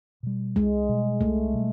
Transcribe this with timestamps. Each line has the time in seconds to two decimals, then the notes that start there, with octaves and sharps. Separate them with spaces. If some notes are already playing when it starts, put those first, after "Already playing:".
0.23 B2 G3
0.55 C2 G#3
0.89 B2 G3
1.21 C2 A3
1.53 B2 G3